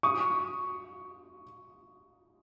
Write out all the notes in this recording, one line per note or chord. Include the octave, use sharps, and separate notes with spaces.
C#6 D#6